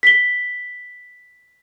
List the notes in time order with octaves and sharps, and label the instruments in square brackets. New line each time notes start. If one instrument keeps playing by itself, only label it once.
[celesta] B6 G7